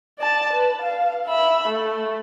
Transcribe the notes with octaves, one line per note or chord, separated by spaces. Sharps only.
D5 A5
B4
F5
E5 B5
A3